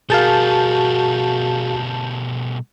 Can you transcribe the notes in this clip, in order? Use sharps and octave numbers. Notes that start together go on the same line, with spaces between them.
B2 G3 F#4 G#4 A#4 F5 A5 G6